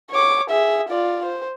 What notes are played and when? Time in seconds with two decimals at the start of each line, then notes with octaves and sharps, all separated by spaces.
0.10 C#5 D6
0.50 G#4 E5
0.89 F4 D5
1.25 C5